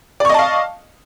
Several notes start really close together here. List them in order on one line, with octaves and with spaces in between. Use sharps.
D5 C#6 D#5 A5 F5